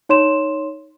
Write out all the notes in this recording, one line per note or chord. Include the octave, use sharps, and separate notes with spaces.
D#4 C#5 C6 E7